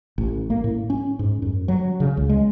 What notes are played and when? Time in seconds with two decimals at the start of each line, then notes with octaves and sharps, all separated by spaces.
0.18 A1
0.50 A#3
0.64 A2
0.90 C#4
1.19 G#2
1.42 F#2
1.68 F#3
2.00 C#3
2.17 C#2
2.29 G#3